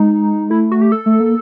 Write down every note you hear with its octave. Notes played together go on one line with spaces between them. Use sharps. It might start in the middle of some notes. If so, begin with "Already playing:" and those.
Already playing: G#3 D#4
A3 E4
F#4
G4
A4
A3
A#3